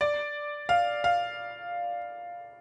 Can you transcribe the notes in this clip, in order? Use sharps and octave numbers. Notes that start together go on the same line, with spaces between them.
D5
F5
F5